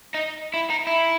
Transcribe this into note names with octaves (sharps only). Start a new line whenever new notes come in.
D#4
E4
D#4
E4